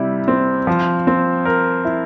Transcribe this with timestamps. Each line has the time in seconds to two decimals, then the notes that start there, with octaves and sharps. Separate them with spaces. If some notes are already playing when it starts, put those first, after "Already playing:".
Already playing: C3 G3 E4
0.28 C4
0.67 F3
1.07 C4
1.45 A#4
1.85 E4